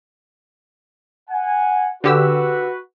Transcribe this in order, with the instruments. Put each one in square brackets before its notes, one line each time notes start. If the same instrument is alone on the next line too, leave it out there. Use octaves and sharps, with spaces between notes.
[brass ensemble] F#5 G#5
[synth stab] D3 G4 E6 [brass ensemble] F#4 B4